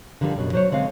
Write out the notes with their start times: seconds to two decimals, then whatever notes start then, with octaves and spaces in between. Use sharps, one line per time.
0.21 D3 D#3 F3 G3 D4
0.36 F#2 B2
0.53 F#3 C5 C#5
0.72 D3 G#3 C4 F5